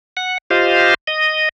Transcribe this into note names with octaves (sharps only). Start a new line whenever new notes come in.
F#5
F4 G4 C5 D#5 F5
D#5